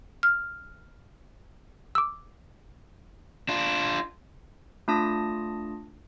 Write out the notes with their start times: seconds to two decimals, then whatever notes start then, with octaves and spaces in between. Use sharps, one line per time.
0.23 F6
1.95 D6 E6
3.49 D4 F4
4.88 A3 D4 F4 A5 D#6 A#6